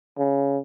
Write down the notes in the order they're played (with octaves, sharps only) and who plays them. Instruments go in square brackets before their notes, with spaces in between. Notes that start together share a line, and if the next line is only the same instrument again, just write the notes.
[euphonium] C#3